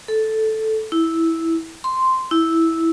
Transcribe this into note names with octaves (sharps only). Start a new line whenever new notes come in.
A4
E4
C6
E4